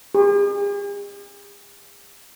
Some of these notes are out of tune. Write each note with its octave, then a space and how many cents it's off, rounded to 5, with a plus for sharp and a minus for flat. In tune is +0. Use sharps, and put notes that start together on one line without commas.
G#4 -45